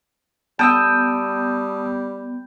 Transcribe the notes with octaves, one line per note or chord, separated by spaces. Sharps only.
G3 B3 G5 A5 D#6 E6